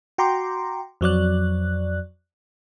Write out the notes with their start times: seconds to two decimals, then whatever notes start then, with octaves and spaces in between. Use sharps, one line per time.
0.18 F#4 G5 A#5 C6 D6
1.01 F2 F#3 D5 F#6